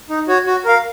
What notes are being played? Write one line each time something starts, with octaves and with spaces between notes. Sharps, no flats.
D#4
F#4 C#5
F#4
A#4 F5